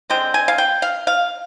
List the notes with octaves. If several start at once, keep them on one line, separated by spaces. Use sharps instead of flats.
D3 G#3 C4 G5
G#5
F5
G5
F5
F5